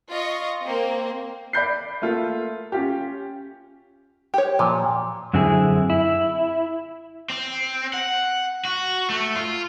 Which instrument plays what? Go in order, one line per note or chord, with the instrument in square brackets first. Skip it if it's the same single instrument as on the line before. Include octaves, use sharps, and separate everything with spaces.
[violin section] F4 D#5 C#6
A#3 C4
[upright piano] D5 B5 G6 C7
A3 A#3 F4
C#4 F4 G4
[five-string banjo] G4 C#5
[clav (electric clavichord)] A#2 [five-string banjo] F3
[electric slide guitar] F#2 D3 C4 E4 G#4
E4
[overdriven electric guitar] C4
F#5
F#4
A3
F4